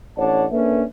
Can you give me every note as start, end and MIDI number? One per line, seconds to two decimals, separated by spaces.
0.18 0.45 33
0.18 0.45 62
0.18 0.45 73
0.18 0.45 74
0.18 0.45 78
0.18 0.45 81
0.51 0.83 58
0.51 0.83 61
0.51 0.83 62
0.51 0.83 69
0.51 0.83 71
0.51 0.83 76